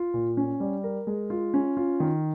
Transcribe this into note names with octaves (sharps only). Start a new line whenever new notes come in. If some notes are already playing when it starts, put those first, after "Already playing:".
Already playing: F4
A#2
C#4
G3
A#4
G#3
F4
C#4
F4
D#3